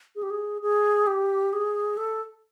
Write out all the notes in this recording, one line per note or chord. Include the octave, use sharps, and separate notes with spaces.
G#4
G4
G#4
G#4
G4
G#4
A4